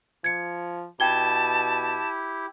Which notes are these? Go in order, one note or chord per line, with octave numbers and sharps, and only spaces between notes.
F3 G#6 C#7
B2 E4 G4 G5 A5 G#6 G7